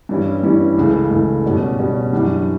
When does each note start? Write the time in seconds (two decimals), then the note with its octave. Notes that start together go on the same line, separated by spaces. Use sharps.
0.09 G2 E3 G3 C#4 E4
0.43 G2 E3 G3 C#4 E4
0.78 C#2 C#3 E3 A3
1.10 C#2 C#3 E3 A3
1.45 B2 G3 C#4 F#4
1.79 B2 G3 C#4 F#4
2.13 F#2 E3 G3 D4 F#4